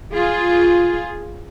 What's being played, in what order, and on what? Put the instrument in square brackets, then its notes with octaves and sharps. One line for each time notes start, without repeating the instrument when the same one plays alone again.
[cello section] F4 G#4